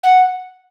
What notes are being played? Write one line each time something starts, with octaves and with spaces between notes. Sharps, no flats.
F#5